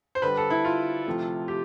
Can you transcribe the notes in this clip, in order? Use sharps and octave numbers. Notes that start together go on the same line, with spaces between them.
C5
D3 G3 B4
A4
E4
F4
C3 F3 A3
G4